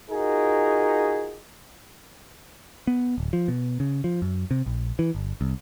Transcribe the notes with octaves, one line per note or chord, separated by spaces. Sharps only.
D#4 F4 F#4 G#4 A#4
B3
D1
F3
B2
C#3
F3
F#2
C3
A#1
E3
G1
C2